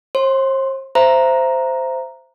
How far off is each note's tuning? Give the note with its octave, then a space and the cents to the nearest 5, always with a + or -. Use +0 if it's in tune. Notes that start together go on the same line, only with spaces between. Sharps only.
C5 +40 C6 +0
C5 -5 E5 +30 A#5 +0